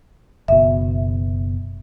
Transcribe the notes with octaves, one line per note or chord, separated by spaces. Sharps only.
F#1 B2 E5